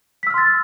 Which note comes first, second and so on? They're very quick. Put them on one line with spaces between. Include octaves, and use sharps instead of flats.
B6 E6 F6 C6 A6